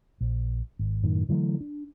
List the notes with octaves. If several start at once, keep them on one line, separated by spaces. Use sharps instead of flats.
A#1
G#1
F#2 A2 D#3
D3 E3 F#3 A3
D4